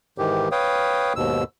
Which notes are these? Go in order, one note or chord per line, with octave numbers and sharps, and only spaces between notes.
G#2 D#3 E3 G4
B4 C#5 F5 G5 D#6
D#2 G#2 B2 E6